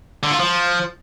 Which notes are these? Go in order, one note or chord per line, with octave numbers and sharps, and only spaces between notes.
D3
F4
F3